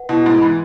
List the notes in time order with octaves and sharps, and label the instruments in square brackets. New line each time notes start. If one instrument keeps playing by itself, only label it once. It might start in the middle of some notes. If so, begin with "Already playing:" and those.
Already playing: [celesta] B4 F#5
[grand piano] B2 [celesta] E4
[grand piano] G#2 [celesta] E4
[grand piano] E3 [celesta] B5